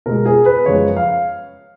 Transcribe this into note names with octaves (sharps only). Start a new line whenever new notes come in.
B2 G#3 A#4
G#4
B4
F#2 F3 G#3 C#5
F5